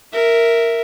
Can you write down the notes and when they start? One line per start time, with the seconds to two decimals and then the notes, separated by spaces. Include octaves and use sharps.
0.13 A#4 E5